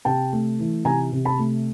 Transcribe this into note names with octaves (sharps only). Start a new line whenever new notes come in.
C3 G5 A5
A3
E3
C3 G#5 A#5
C3
A5 B5
A3